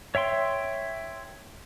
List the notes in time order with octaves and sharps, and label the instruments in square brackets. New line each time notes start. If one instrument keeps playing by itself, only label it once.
[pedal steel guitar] C#5 E5 G5 C6